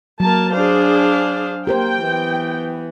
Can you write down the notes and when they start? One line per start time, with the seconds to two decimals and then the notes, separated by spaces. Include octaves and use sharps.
0.20 F#3 A#3 A#4 A5
0.53 D4 G#4 C5 F5
1.67 A#3 G4 A#4 C5 G5
2.03 E3 B3